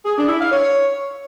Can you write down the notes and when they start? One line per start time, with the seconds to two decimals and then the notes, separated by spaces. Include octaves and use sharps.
0.05 G#4
0.17 D4
0.28 E4
0.40 F5
0.51 C#5